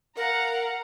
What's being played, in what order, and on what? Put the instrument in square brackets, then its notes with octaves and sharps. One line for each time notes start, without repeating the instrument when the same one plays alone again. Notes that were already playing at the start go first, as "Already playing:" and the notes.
[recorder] A#4 [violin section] F5 F#5 A#5